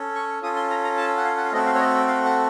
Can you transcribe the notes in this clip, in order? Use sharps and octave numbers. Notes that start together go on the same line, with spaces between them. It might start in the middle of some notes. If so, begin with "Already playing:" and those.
Already playing: C#4 A4
C#6
C#4 F4 A4 D#6
C6
A#5
A#5
A5
F#5
F5
F#5
F5
A3 C4 F#4 A4 D#5
F5
C#5
D#5
F5
F#5